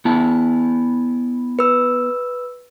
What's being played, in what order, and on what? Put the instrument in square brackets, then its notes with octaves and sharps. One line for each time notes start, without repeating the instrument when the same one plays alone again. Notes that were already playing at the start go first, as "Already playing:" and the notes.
[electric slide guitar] B3 E4 A5
[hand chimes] B4 E6